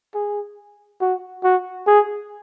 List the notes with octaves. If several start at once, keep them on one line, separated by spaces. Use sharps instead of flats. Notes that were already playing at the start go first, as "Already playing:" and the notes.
G#4
F#4
F#4
G#4